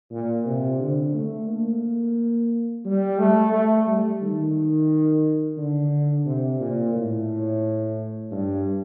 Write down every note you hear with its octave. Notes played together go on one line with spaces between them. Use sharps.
A#2
C3
D3
A3
A#3
G3
A3
A3
G3
D#3
D3
C3
A#2
A2
G2